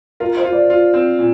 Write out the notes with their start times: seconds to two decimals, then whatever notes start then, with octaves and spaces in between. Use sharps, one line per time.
0.20 F4 A#4
0.37 C5
0.44 F4
0.53 D5
0.70 F4
0.94 C4
1.19 A#2